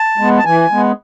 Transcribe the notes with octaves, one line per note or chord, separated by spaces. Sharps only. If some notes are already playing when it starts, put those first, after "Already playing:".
Already playing: A5
G#3 B3
A5
E3 G#5
G#3 B3